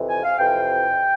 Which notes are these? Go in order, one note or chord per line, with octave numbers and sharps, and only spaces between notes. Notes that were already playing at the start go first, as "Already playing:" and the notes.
Already playing: F2 C3 E3
G#5
F5
F2 C3 E3 G5